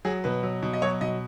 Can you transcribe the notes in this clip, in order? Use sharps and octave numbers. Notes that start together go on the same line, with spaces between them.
F#3 G#4
B2 B4
F#3
B2
D#5
F#3 C#5
B2 D#5